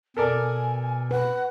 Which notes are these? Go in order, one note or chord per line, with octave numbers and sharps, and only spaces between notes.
B2 A4 A#4 D5 G#5
B4 F#5